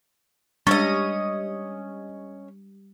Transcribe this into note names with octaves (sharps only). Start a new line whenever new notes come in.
G3 G#3 C#4 D4 C#5 D#5 C#6